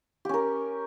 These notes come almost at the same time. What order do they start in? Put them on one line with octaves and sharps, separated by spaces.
G4 C#4 A#4